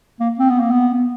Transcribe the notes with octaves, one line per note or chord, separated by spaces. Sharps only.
A#3
C4
B3
A#3
B3
B3